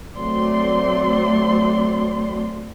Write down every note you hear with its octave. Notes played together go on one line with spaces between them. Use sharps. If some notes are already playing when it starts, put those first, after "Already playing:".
F#3 A3 C4 D5 C6